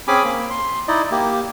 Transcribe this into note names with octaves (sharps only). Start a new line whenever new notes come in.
C4 C#4 G#4 G#5 B5 D6
A#3
C6
D#4 E4 D5 D#5
A#3 G4